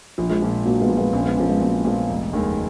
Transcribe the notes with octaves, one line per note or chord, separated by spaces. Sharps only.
A#1 F3
F3 G#3
A#2 F3
A#1 F#3 A#3
G#3 B3
A#2 F3
G#3 B3
A#1 A#3 C#4
G#3 B3
A#2 F3 A#3 C#4
G#3 B3
A#1 F#3 A#3
A#2 F3 G#3 B3
F1
D#2 D#3 G#3